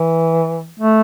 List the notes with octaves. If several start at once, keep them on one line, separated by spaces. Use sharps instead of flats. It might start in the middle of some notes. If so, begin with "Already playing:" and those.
Already playing: E3
A3